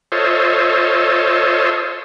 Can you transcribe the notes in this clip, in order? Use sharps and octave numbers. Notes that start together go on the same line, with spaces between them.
F4 A4 C5 C#5 D#5 E5